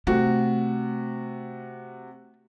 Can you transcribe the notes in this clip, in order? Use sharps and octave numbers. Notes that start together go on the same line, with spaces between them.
C3 A3 F#4